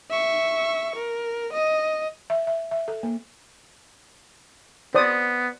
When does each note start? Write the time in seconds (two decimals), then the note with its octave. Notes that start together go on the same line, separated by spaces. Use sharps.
0.10 E5 C#6
0.96 A#4
1.53 D#5
2.30 E5
2.47 E5
2.71 E5
2.88 A4
3.03 A#3
4.95 B3 C5 D5 D#6